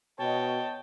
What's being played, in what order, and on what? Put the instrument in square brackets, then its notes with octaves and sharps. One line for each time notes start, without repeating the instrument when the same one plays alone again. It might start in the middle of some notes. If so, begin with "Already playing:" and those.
[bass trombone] B2 [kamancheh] C#5 D#5 [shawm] G5 [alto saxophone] A5